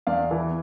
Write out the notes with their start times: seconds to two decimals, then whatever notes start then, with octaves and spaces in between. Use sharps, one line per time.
0.07 E2 D5 F5
0.31 E3